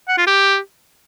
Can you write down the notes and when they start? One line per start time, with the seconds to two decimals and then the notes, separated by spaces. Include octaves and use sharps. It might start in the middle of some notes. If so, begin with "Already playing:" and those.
0.08 F#5
0.18 F4
0.27 G4